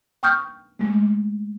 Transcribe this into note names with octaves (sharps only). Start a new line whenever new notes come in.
G5 C#6 D#6 F6 G6
G#3 A3